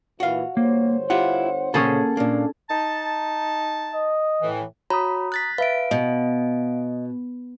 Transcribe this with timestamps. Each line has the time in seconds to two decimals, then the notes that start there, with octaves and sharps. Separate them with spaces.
0.20 A#2 E3 E4 F#4 F5
0.57 G1 A#3 C5 C#5
1.10 E4 F4 G4 F#5
1.74 A#2 C#3 A#3 C#4 G#4 A4 C5
2.17 A#2 A#3 D4
2.70 D#4 A5
3.93 D#5
4.42 A2 E3
4.90 F#4 C#5 A#5 B5 D#6
5.32 F#6 A6 B6
5.58 B4 E5 F5 D7
5.91 B2 D#5